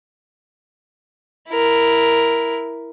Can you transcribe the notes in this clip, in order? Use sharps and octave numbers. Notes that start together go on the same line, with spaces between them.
E4 A#4